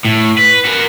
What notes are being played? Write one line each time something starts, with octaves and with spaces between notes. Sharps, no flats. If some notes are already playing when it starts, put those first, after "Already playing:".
A2
B4
F#4 A#4